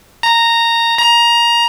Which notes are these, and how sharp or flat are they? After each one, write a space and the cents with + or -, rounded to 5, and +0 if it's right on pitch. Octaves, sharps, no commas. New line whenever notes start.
A#5 -10
A#5 +15